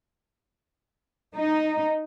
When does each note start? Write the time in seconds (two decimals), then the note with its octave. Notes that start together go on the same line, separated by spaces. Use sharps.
1.36 D#4